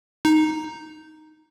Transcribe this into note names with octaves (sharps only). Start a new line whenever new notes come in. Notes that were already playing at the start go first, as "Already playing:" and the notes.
D#4